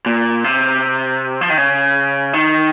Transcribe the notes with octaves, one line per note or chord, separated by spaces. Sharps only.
A#2
C3
F3
D#3
C#3
D#3